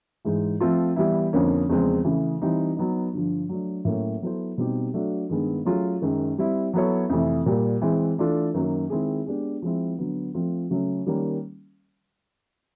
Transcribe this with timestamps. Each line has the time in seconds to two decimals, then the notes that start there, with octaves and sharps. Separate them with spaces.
0.25 G#2 E3 G#3
0.61 F3 A3 C4 F4 A4
0.96 E3 G3 B3 E4
1.33 F2 D3 F3 A#3 C#4
1.69 E2 C#3 F3 G#3 C4
2.04 C#3 E3 A3
2.41 E3 G3 C4 D#4
2.77 F#3 B3 D#4
3.13 G2 D3 F3
3.49 F#3 A3 D4
3.85 A2 F#3 A#3 C#4
4.22 F#3 B3 E4 A4 C5
4.58 B2 G3 C4 D#4 G4
4.94 F#3 A3 D4 F#4
5.29 G2 D#3 G#3 B3
5.65 F#3 A3 C#4 F4 G#4
6.02 F#2 D#3 G#3
6.38 G3 C4 E4
6.74 F#3 B3 E4 A4 C#5
7.09 F2 C3 E3 A3
7.46 A#2 G3 A#3
7.82 E3 G#3 C4
8.18 E3 A3 D4 F4 A4
8.54 F#2 D#3 F#3 A#3
8.90 D#3 G#3 C4 E4 G#4
9.26 G#3 B3 D4 G4
9.62 F3 G#3 C4 E4
9.98 D3 F#3 B3
10.34 F3 A3 C4 F4
10.70 C#3 F#3 A3 C#4
11.06 D#3 G3 A#3 C#4